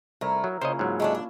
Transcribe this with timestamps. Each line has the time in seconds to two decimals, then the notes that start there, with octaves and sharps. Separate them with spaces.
0.21 C2 A3 E4 A#4
0.44 F#3
0.61 A#2 C#3 C#4 C5 C#5 D#5
0.79 G#2 F#3
1.00 G#3 A3 D4
1.15 D4